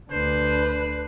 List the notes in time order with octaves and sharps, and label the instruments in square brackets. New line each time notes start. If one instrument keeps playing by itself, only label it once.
[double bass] D2 D4 [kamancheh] B4 [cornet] C5